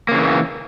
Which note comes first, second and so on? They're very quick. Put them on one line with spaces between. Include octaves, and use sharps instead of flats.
A#3 C#3 E3